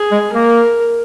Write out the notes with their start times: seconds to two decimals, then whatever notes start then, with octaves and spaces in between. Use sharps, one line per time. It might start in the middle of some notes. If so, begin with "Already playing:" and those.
Already playing: G#4
0.12 G#3
0.34 A#3 A#4